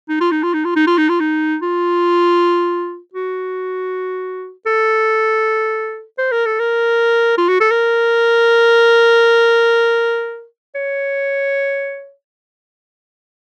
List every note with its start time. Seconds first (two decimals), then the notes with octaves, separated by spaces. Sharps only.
0.09 D#4
0.21 F4
0.31 D#4
0.43 F4
0.54 D#4
0.65 F4
0.76 D#4
0.87 F4
0.98 D#4
1.09 F4
1.20 D#4
1.62 F4
3.14 F#4
4.66 A4
6.19 C5
6.31 A#4
6.46 A4
6.60 A#4
7.38 F4
7.49 F#4
7.60 A4
7.71 A#4
10.75 C#5